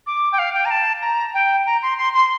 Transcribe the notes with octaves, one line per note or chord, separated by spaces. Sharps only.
D6
G5
F5
G5
A#5
A5
A#5
G5
A#5
C6
C6
C6